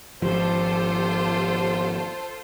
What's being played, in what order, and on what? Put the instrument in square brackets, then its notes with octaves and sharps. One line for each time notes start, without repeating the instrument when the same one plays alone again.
[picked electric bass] G#1 F3 [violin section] F4 A4 C5 [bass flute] G4